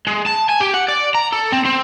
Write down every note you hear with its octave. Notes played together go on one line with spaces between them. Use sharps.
G#3
A5
G#5
G4
F#5
D5
A#5
A4
C4
C4